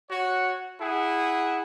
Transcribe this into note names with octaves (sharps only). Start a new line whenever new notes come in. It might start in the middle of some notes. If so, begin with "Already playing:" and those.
F#4 C#5 F#5
E4 G#4 F#5